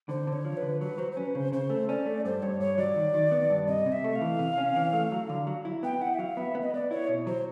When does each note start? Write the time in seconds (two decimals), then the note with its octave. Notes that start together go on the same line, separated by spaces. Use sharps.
0.09 D3 C5
0.27 D3
0.32 C#5
0.45 F3
0.57 B4
0.62 D3
0.81 F#3 B4
0.98 F#3 C5
1.12 C5
1.17 C#4 B4
1.35 C#3 C5
1.52 C#3 C5
1.70 A3
1.89 C#4 D5
2.06 A3
2.25 G2 C5
2.42 G2 C#5
2.60 G2 C#5
2.77 F#3 D5
2.96 D#3
3.14 D#3
3.32 B3
3.50 G2
3.67 C3 D#5
3.86 C3
3.92 E5
4.04 A3
4.15 F5
4.21 E3
4.39 C3
4.58 C#4
4.76 E3
4.93 A3
5.12 F#3
5.29 D3
5.47 F#3
5.65 E4
5.83 B3 G5
6.01 E4 F#5
6.14 E5
6.19 F#3 F5
6.37 B3 E5
6.55 B3
6.62 D#5
6.74 B3 D5
6.91 E4 C#5
7.08 B2
7.27 F#3 C5